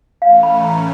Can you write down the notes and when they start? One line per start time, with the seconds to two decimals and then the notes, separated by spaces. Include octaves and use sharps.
0.22 A2 E3 A3 C#4 F5
0.43 B5
0.64 A#5